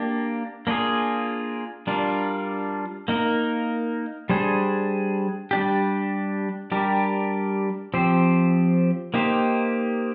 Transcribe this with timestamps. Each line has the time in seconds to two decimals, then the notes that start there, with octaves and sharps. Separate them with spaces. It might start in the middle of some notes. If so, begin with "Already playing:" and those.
Already playing: A#3 D4 G4
0.67 A#3 D4 F4 G#4
1.87 G3 D4 F4 A#4
3.08 A#3 D#4 A#4
4.29 G3 D4 G#4 C5
5.51 G3 D4 G4
6.72 G3 D4 G4 A#4
7.94 F3 C4 G4 C5
9.14 A#3 D#4 G4 C5